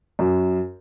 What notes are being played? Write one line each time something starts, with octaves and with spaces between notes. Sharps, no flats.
F#2